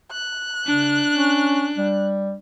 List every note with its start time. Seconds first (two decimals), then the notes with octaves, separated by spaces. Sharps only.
0.11 F#6
0.66 C#3 D4
1.13 C#4
1.78 G3